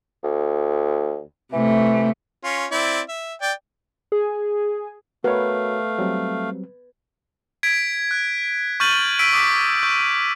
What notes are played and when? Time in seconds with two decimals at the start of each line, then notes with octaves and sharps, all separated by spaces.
0.23 D2
1.53 C3 E3 A3
2.44 C#4 F4
2.71 C4 E4 D5
3.09 E5
3.41 D5 G5
4.12 G#4
5.24 A3 F#4 A#4 B4 C#5 F5
5.99 F#3 G3 C4
7.63 G#6 B6 D7
8.11 F#6
8.80 C#6 F6 G6 A6 D#7 F#7
9.19 E6 B6 D7 D#7
9.33 D6 D#6 B6
9.83 C#6 G6